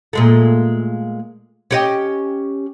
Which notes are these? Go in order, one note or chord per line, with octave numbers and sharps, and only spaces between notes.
A#2 G#3 A3
C#4 G4 D#5